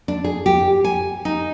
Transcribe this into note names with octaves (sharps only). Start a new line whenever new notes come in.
D4
G#4
G4
G#5
D#4